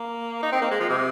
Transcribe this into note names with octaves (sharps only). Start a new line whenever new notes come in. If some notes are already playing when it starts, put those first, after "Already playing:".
Already playing: A#3
D#4
C4
A#3
G#3
F3
C3